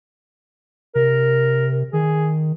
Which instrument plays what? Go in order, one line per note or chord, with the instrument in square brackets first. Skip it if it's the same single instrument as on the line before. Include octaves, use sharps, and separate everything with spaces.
[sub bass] C3 [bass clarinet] A#4
[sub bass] D#3 [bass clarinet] G#4